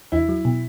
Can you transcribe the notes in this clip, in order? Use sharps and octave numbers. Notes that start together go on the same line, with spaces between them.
E2 E4
F#3
B2